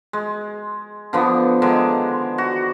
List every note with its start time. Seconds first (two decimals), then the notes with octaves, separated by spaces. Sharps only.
0.13 G#3
1.13 D3 F3 B3
1.62 D3 D#3 G#3
2.38 F#4